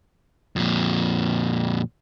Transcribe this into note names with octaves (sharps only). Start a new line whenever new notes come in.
F2 A#2